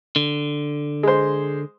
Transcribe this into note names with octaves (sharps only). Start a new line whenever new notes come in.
D3
G#3 C5